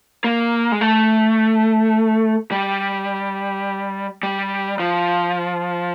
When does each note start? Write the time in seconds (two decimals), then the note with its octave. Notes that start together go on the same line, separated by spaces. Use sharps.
0.24 A#3
0.72 G#3
0.81 A3
2.51 G3
4.23 G3
4.80 F3